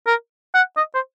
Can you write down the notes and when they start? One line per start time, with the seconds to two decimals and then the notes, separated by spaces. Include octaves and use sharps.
0.07 A#4
0.55 F#5
0.77 D#5
0.95 C5